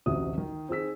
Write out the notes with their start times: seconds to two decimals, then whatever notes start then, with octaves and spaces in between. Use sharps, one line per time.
0.06 A1 D2 C3 F#4 E5 D#6
0.38 D#3
0.69 C4 D#4 G#4 E6 B6